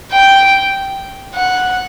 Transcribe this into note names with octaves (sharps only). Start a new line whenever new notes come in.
G5
F#5